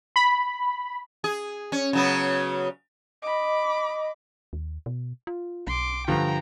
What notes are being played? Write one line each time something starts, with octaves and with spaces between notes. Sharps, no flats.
B5
G#4
C#4
C#3 F#3 B3
D#5 B5 D6
D#2
B2
F4
B1 C6 D6
G2 D3 F3 G5 A#5